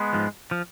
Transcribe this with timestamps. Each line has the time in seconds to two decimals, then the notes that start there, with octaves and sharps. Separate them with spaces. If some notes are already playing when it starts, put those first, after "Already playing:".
Already playing: G#3 B3
0.13 G#2 F3
0.51 F3